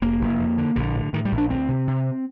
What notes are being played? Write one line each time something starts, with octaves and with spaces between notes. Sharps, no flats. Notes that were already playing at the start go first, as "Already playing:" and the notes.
F1 A#3
F1
F2
D3
A#1 D3
A2
A2 D#3
G3
A#1
D4
D2 C4
C3
C3